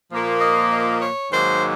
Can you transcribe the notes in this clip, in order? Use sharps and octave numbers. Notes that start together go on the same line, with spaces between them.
A#2 F3 A#3
D#5
D#5
C#5
G#2 D#3 F#3 A#3 C5